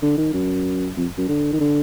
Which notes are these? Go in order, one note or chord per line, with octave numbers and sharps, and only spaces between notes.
D3
D#3
F#2
F2
F#2
D3
D#3
D3